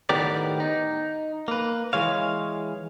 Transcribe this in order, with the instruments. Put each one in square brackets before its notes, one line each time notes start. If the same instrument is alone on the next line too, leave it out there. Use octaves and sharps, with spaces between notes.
[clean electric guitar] A2 D#3 B3 G4 A#4 D5
D#4
A#3 B4
E3 G#3 C#5 F5